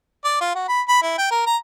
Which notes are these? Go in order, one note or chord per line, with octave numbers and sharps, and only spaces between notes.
D5
F4
F#4
B5
B5
E4
G5
A#4
A#5